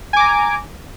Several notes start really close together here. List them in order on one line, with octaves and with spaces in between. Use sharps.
G#5 D6 A#5